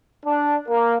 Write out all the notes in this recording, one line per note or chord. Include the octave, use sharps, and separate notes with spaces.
D4
A#3